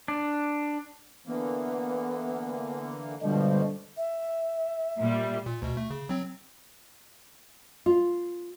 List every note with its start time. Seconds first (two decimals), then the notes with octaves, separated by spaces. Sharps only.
0.08 D4
1.26 D3 E3 A#3 B3
3.22 G2 B2 D3 F3 G3 G#3 D4
3.97 E5
4.99 A#2 G3
5.46 A#2
5.62 D2 B2
5.77 A3
5.90 C#3
6.09 F#3 C4
7.86 F4